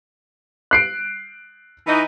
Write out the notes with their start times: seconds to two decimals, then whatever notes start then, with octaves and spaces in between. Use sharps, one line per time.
0.71 F#6 C7 D7
1.87 E3 D#4